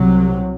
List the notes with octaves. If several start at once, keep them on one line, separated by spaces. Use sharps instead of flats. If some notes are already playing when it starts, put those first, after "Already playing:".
Already playing: C2 C3 F#3